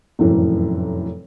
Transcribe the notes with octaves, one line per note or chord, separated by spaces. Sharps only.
F1 F#2 A2 E3